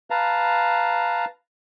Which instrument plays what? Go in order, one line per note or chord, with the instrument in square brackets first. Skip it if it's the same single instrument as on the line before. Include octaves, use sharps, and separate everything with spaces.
[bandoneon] B4 F5 A5 A#5